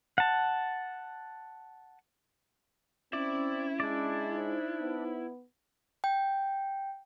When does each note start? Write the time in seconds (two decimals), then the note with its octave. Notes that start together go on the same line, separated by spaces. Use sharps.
0.18 F#5 A5
3.13 C4 C#4 E4 D5
3.80 G#3 D4 D5
4.33 D#4 C5
4.81 B3
6.04 G5